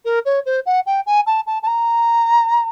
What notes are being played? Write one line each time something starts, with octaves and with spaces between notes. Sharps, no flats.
A#4
C#5
C5
F#5
G5
G#5
A5
A5
A5
A#5